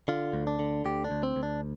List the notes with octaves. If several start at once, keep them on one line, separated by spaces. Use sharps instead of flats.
D3 F4
D2
D4
D3
D2 G4
D4
D2
C4
D2
D4